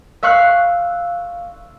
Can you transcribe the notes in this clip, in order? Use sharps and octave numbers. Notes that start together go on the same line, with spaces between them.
E5 F5 C#6 F6 F#6 C7